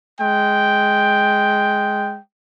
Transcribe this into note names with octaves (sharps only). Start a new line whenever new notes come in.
G#3 G5